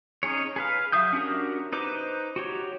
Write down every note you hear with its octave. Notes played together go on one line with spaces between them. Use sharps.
C#4 D#4 G#4 C#5
G#4 B4 F5
F#3 E5 F5 D#6 G6
C#4 D4 F#4 G4 A#4
D#4 B4 C5 D6
F#4 G4 C#5